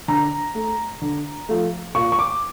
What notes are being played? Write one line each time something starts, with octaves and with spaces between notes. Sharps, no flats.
D3 A#5
A3
D3
F3 A3
A#2 C#6
C#6
D6